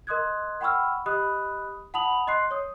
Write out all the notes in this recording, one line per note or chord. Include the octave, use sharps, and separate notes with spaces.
A#4 D#5 C6 D#6 F#6 G#6
F#5 G5 B5 C#6 E6 F6
G4 D#5 B5 D#6 F#6
F#5 A5 B5 D#6 F7 F#7
D#5 C6 F#6 C7
C#5 D#6